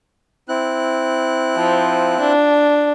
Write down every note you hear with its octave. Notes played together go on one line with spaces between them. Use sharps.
C4 E4 F#6
F3
D4